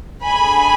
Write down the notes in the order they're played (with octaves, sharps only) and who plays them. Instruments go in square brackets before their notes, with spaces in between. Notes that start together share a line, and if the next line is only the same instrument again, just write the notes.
[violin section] A3 D4 G#4 G#5 B5